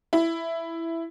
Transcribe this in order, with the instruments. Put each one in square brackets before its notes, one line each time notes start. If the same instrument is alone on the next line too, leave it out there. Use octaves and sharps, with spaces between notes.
[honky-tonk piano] E4